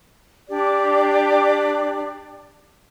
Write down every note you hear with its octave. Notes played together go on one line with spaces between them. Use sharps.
D4 G4 D5